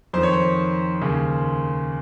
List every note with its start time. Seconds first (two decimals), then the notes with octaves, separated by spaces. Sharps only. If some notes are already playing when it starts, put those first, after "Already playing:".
0.13 F2 D#3 C5
0.23 C#5
0.33 C5
1.02 D#2 C#3